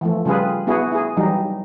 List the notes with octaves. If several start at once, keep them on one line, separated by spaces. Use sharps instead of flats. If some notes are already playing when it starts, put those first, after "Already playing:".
E3 F3 A3
C#3 G3 F4 G#4 B4
B3 E4 F#4 G#4
E4 G#4
E3 F#3 G3 D#4